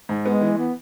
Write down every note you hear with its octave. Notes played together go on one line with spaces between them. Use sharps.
G#2
G#3 B3
E3
B3